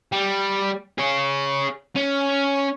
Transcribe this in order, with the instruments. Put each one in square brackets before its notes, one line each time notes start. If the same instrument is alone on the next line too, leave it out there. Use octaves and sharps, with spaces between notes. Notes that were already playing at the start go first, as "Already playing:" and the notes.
[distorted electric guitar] G3
G#4 C#5
C#4